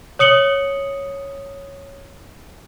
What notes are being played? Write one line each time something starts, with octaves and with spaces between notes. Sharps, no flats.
C#5 D#6 C#7 F#7 G7